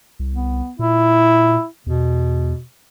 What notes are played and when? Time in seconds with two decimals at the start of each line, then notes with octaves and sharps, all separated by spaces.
0.19 C2
0.34 B3
0.79 A#2 E4
1.87 E2 B2